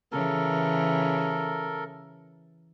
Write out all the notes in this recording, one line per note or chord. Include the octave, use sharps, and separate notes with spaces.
C#3 E3 A4 A#4